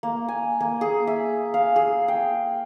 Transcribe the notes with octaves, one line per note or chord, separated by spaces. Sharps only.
A#3
G#5
A#3
G#4
E5
F5
G#4
G5